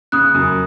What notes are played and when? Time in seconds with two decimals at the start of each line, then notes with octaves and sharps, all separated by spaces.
0.12 C#3 D#6 F#6
0.34 F#2